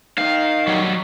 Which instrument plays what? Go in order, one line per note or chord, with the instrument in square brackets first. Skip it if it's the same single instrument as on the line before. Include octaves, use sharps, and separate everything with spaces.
[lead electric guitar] D#3 D#4 [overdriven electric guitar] F5
[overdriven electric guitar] F#3 G3